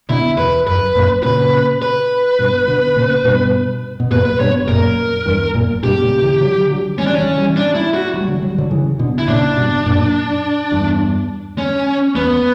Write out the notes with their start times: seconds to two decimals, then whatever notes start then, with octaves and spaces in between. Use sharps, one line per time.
0.09 B2 D3 E4
0.37 E2 B4
0.67 F#2 B4
0.95 F#2 A#2
1.23 A#2 C#3 B4
1.82 B4
2.39 G2 B2
2.67 B2 D3
2.96 A#2 C#3
3.25 G2 B2
4.00 B2
4.11 F#2 A#2 B4
4.25 B4
4.40 G2 B2 C#5
4.68 F#2 A#2 A#4
5.26 E2 G2
5.55 F#2 A#2
5.83 G2 B2 G4
6.02 A#2 C#3
6.22 C#3 E3
6.40 D3 F#3
6.70 D3 F#3
6.98 E3 G3 C#4
7.06 D4
7.15 E3 G3 C#4
7.36 E3 G3
7.56 D4
7.75 E4
7.94 F#4
8.14 F#3
8.20 G3
8.28 D3 F#3
8.42 F#3
8.50 G3
8.58 D3 F#3
8.71 C#3 E3
8.99 B2 D3
9.18 E4
9.28 A#2 C#3 D4
9.57 G2 B2
9.86 F#2 A#2
10.71 E2 G2
11.58 C#4
12.15 E2 B3